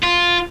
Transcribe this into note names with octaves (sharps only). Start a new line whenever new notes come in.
F4